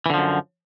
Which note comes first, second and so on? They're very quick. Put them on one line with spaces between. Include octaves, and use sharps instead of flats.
E3 D3 F3 F#2